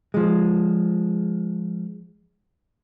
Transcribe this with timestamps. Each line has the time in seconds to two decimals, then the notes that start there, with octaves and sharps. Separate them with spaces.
0.14 F3 G#3